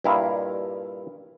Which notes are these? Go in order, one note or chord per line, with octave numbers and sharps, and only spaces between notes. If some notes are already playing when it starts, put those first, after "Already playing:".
G2 A#2 E4 D#5 F5